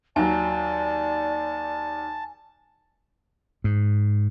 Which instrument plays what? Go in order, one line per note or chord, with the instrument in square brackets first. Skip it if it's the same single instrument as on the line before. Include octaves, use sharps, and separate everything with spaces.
[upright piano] D#2 F#3 [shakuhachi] D5 [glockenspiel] G#5 [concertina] A5
[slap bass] G#2